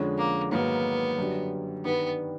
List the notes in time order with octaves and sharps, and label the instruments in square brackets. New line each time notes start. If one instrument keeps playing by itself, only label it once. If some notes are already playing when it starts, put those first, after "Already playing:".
Already playing: [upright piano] F2 D3 F3 G#3 C#4
[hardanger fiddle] A#3
[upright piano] G#2 D#3 F#3 A#3 [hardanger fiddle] B3
[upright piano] F#2 D3 G3
[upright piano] G2 D#3 G3 [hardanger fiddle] B3